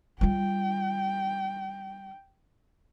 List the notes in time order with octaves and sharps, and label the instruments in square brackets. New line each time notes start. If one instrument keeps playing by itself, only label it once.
[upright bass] G3 F4 [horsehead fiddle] G5